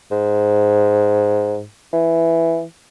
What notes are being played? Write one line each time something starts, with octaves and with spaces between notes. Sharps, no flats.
G#2
E3